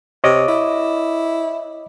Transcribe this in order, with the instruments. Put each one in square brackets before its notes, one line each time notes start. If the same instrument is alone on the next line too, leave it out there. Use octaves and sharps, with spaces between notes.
[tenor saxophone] C3 [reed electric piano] C#5 D#5 D6
[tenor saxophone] E4